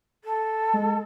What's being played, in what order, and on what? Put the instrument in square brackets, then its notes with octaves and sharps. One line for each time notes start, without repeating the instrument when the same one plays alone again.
[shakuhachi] A4
[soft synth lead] G#3